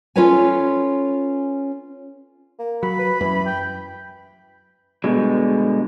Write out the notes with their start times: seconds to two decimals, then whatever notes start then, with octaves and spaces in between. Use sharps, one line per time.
0.16 C#4 F4 A4 B4 C#5 G#5
2.59 A#3
2.83 F#3 B5
2.99 B4
3.21 F#2 E3
3.46 G5
5.04 B2 D3 G3 G#3